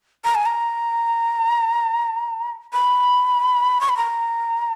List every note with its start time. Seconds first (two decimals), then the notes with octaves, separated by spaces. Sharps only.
0.24 A#5
0.35 G#5
0.46 A#5
2.73 B5
3.81 C#6
3.89 B5
3.97 A#5